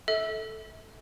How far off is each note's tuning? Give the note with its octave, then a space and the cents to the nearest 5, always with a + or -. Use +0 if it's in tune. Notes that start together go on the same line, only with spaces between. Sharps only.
A4 +0 E5 -35